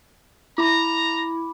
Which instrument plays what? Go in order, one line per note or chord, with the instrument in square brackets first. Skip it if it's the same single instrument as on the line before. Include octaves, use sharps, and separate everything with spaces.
[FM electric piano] E4 [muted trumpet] A#5 [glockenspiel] B5 D6